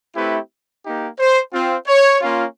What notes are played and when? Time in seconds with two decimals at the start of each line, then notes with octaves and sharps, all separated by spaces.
0.15 A3 C4 E4 G4 B4
0.84 A#3 D#4 G4
1.19 C5
1.52 C4 F4
1.87 C#5
2.21 A#3 C#4 F4